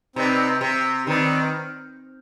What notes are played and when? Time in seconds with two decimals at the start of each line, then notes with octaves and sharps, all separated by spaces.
0.16 C3 C4 D#4 B4 D5
0.61 C3
1.07 D#3 C4 D#4 B4 D5